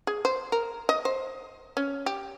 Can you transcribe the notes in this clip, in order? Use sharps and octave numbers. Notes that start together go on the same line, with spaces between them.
G#4
C5
A#4
D#5
C5
C#4
G4